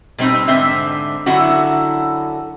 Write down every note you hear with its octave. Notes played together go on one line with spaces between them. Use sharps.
B2 G3 C4 D#4
G#2 D3 C4 C5 E5
F#2 D3 E4 F#4